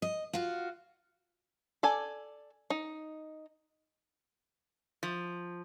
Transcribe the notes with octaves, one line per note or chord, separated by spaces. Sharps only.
D#5
F4 F#4
A4 D5 G#5
D#4
F3